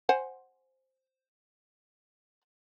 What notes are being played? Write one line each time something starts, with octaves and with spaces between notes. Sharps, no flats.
C5 F#5 G#5